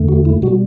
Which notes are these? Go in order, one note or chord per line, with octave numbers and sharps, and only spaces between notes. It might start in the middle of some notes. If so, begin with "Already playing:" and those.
Already playing: E2 D3 A3
F#4
E4
B2 G3 F#4